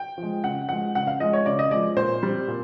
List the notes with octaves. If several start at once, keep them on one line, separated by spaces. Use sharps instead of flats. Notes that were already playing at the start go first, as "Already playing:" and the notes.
Already playing: G5
F3
G#3
C#3 F#5
F3 G#3 F#5
C#3 F#5
F5
F3 G#3 D#5
C#5
C#3 D5
D#5
F3 G#3 D5
A#2 C5
G3 C4
A#2